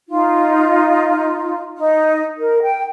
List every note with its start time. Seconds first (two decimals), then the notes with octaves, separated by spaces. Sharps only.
0.09 D#4 F4
1.76 D#4
2.39 A#4
2.63 G5